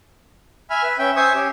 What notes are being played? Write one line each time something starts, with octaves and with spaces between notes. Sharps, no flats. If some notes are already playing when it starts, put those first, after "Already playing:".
E5 G#5 B5 F6
B4
C#4 E5 G5
C5 E5 G#5 C#6 D#6
C#4 G4